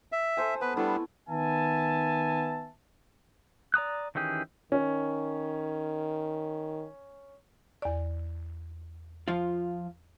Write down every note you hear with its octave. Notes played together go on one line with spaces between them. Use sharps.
E5
A4 C5 G#5
B3 B4
G3 A3 B3 D4 E4
D#3 B3 E5 G#5 A5
D5 A#5 D#6 F#6
D#3 E3 C#4 G4 G#4
D#3 C#4
E2 D5
F3 F4